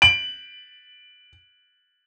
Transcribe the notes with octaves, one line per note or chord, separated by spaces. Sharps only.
D7 F#7